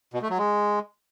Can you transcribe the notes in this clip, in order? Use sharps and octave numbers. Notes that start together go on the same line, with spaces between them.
B2
A3
F#3
G#3